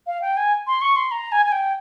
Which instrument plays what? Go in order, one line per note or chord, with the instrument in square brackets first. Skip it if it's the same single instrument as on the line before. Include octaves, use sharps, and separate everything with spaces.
[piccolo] F5
G5
G#5
C6
C#6
C6
A#5
G#5
G#5
G5